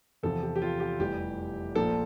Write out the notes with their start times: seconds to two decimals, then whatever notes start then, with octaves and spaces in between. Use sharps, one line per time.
0.23 E2 C3 F3 A4
0.42 G4
0.56 G4
0.62 F4
0.80 G4
0.99 F1 E2 E3 G3 G4
1.75 A#1 A#2 F3 A4